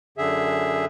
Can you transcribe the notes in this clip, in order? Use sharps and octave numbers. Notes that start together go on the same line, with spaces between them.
F#2 D3 G#4 E5